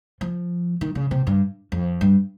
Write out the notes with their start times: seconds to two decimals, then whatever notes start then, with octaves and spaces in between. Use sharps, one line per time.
0.21 F3
0.81 D#3
0.95 C#3
1.11 C3
1.27 G2
1.72 F2
2.01 G2